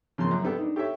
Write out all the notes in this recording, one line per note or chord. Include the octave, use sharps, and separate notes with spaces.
C#3 F3 A#3 C6
F#2
G3 B3 A4 G5
D4 D#4
G4 A4 C#5 E5